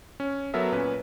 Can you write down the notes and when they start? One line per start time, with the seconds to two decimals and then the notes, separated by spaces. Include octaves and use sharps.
0.20 C#4
0.54 F#3 B3 A4 A#4 E5
0.72 A#2 C#4 B4